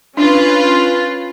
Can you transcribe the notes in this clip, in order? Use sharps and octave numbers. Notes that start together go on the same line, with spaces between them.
C#4 D4 F4 B4